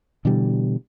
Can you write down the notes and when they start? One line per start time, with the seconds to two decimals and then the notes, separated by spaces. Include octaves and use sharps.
0.25 B2 D3 E3 G3